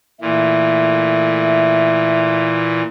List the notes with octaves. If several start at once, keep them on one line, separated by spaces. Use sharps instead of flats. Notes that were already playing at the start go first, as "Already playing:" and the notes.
A#2 E3 A3 E5